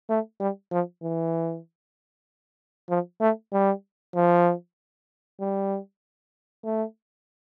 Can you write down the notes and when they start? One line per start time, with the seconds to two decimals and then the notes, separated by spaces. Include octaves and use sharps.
0.09 A3
0.40 G3
0.71 F3
1.02 E3
2.89 F3
3.21 A3
3.52 G3
4.15 F3
5.40 G3
6.64 A3